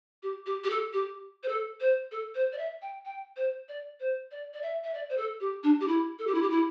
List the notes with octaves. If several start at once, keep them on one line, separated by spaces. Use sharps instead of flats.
G4
G4
G4
A4
G4
C5
A4
C5
A4
C5
D5
E5
G5
G5
C5
D5
C5
D5
D5
E5
E5
D5
C5
A4
G4
D4
G4
E4
A4
G4
E4
G4
E4